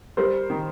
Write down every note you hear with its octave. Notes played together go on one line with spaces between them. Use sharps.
G3 A#4 C5
D#3